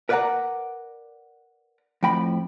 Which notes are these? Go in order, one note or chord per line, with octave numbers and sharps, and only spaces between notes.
A#4 B4 D5 F5 F#5 A#5
F2 A2 G5 B5